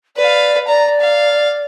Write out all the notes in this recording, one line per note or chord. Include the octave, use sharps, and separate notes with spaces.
B4 D5 F5
D5 A#5
F5